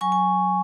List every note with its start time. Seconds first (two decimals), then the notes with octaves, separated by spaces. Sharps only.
0.01 F#3 G#5 C#6
0.12 G#5